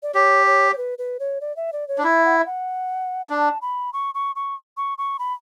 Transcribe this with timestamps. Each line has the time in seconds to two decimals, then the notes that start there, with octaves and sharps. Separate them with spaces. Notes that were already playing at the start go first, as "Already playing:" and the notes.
0.03 D5
0.14 G4 C#5
0.46 C#5
0.72 C#5
0.77 B4
0.98 B4
1.20 C#5
1.41 D5
1.56 E5
1.73 D5
1.88 C#5
1.98 D4
2.04 E4 E5
2.25 F#5
2.39 E5
2.46 F#5
3.30 D4 A5
3.61 B5
3.93 C#6
4.14 C#6
4.35 C#6
4.77 C#6
4.98 C#6
5.19 B5